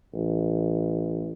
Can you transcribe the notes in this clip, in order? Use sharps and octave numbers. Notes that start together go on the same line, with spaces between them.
A1